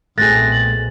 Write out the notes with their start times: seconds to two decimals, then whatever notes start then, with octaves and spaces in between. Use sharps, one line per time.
0.18 B1 A#2 A3 C4 G#4 F#6 A6 A#6
0.52 A6 F#7